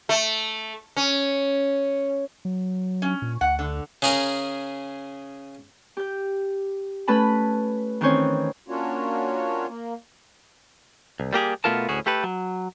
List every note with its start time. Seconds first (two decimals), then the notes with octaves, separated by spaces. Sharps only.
0.09 A3
0.96 C#4
2.45 F#3
3.02 C#4
3.22 A#2
3.41 D2 F#5
3.59 D3
4.02 C#3 G#4 A#4
5.97 G4 G6
7.08 A3 C#4 B4 A5 B5
8.01 D#3 E3 C4 C#4 C5 C#5
8.68 A#3 C#4 D4 F4 F#4 C#5
9.68 A#3
11.20 C2
11.33 G3 A#3 G4 G#4
11.64 B2 A3 B3 F4 A#4 A5
11.89 D2 A2 C#4 F#4 G#4
12.06 A3 G4 A4 B4
12.24 F#3